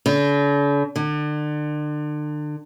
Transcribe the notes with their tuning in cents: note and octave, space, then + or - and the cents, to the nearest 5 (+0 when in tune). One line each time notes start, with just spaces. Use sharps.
D3 -45
D3 +35